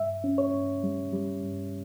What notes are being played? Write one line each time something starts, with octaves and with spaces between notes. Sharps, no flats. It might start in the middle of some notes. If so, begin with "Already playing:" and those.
Already playing: G2 E5
C#4
C#5
G2
G3
G3
G2